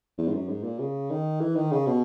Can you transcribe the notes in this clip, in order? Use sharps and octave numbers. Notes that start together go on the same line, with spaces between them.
E2
G#2
F#2
G#2
A#2
C#3
D#3
E3
D#3
C#3
B2